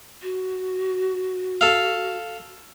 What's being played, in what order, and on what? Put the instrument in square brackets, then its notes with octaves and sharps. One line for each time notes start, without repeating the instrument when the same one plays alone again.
[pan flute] F#4
[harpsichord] A4 F5